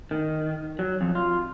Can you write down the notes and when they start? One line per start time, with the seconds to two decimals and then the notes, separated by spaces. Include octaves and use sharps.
0.11 D#3
0.79 F#3
1.01 F2
1.15 F4